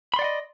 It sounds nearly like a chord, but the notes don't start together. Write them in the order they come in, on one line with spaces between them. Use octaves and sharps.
B5 C6 D5 F#5 D#5